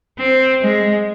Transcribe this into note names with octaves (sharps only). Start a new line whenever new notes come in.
C4
G#3